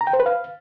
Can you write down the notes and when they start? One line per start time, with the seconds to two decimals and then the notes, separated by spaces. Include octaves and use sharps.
0.01 A#5
0.07 G5
0.13 C5
0.20 B4
0.26 F5